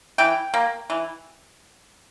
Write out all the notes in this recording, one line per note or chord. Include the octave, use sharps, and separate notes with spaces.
E3 G5
A#3
E3